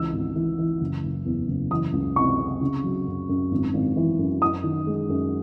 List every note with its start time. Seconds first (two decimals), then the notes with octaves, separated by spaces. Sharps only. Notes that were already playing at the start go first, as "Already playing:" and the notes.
Already playing: C#2 E3 E6
0.13 G#1
0.36 E3
0.58 E3
0.81 F#1
1.03 F#1
1.26 E2
1.48 F#1
1.71 E3 D#6
1.93 C#2
2.16 C3 C#6
2.39 C3
2.61 C#3
2.84 F#3
3.06 F#2
3.29 F#2
3.51 G#1
3.74 G#1
3.97 E3
4.19 F#2
4.42 F#2 D#6
4.64 D#3
4.87 G#3
5.09 F#2